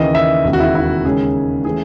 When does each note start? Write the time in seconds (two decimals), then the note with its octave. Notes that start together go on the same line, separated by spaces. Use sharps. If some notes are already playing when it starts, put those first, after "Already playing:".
Already playing: D#2 C#3 E3 D#5
0.15 E5
0.44 E1 D#2 C#3
0.53 F#4
0.60 E4
0.75 E4
1.05 D#2 C#3 G#3 C#4 G#4
1.65 E3 A3 C#4 G#4